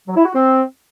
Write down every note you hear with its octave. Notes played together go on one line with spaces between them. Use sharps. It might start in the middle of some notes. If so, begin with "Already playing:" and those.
F#3
E4
F#4
C4